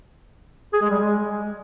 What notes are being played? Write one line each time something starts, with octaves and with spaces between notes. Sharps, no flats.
G#4
G#3
G3
G#3